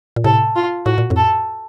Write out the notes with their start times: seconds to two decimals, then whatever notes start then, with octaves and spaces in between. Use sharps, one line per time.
0.16 A#2
0.24 A2 C3 A4
0.56 F4
0.86 A2 F#4
0.98 A#2
1.10 F2 A2
1.16 A4